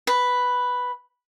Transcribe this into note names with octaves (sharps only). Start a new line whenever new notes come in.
B4